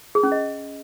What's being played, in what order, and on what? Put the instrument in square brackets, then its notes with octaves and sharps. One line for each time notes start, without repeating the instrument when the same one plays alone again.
[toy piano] G#4
C#4
D#5